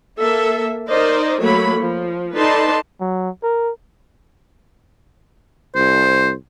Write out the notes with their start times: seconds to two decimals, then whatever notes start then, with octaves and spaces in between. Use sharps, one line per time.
0.19 A#3 A4 E5
0.88 D#4 A#4 C5 D5 D#5
1.41 F#3 A3 A#3 C#5 B5
1.80 F3
2.36 D#4 A4 B4 D5 A5 C6
3.00 F#3
3.42 A#4
5.75 C2 C5